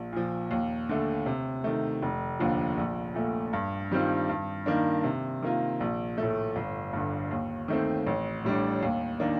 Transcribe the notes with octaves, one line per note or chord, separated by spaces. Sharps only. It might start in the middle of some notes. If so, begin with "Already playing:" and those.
Already playing: A#1
A#2 F3
D#2
D3 A3
C3
D#3 A3
F1
D#2 D3 F3
A#1
A#2 A3
G2
D#3 G3 C4 F4
G2
D#3 A#3 D4
C3
D#3 A#3 F4
A#1
A2 A3
G1
G2 D3
D#2
D#3 A3 C4
A1
A2 G3 D4
D#2
D#3 A#3 D4